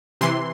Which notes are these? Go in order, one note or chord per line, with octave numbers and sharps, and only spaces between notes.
C3 E3 C6